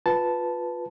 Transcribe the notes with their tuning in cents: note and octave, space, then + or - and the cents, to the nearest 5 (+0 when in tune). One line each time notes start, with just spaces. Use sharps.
F4 +15 B4 +0 A5 -5